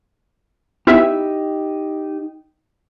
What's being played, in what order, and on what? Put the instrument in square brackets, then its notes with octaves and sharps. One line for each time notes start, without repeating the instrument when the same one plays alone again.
[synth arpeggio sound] B3 E4 E5 [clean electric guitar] D#4 G4